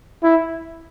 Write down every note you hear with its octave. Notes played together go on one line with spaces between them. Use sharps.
E4